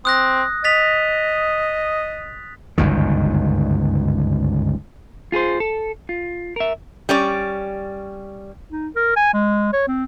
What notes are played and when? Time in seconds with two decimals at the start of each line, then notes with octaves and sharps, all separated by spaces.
0.05 C4 D#6 F#6 A#6
0.64 D#5 A6 B6 F7
2.78 G1 C#2 F#2 D#3
5.32 F4 G#4 A#4 C5
5.60 A4
6.09 F4
6.56 A#4 E5
7.09 G3 C#4 D5
8.72 D#4
8.96 A#4
9.16 G#5
9.34 G#3
9.73 C#5
9.88 C4